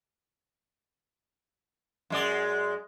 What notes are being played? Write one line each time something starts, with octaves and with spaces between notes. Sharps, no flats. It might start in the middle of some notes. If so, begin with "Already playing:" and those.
F#2 G#3 D5